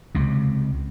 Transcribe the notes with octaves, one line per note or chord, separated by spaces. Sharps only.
C#2 C3